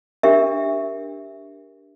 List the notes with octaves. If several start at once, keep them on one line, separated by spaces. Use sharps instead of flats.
D4 G4 A#4 E5